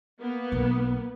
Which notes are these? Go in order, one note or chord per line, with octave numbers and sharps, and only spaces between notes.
A#3 B3
B1